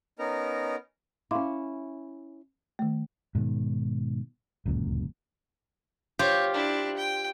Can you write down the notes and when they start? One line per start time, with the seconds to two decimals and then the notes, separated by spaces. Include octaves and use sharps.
0.19 B3 C#4 D#4 A#4 A#5
1.31 C#4 E4 F5 C6 D6
2.79 D#3 A3
3.35 G#2 B2 D#3
4.66 D1 C#2 F#2 A#2
6.19 F4 G4 C5 C#5
6.54 D4 E4
6.96 G5